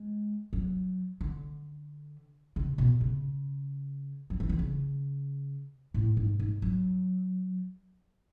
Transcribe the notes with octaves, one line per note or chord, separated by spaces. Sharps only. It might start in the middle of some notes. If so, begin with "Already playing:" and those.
Already playing: G#3
F#3
D3
C#3
B2
C#3
F#3
E3
D3
C#3
A2
G#2
G#2
F#3